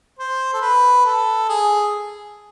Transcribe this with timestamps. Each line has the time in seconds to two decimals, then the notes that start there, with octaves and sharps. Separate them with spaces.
0.19 C5
0.53 A4
0.61 B4
1.05 A4
1.49 G#4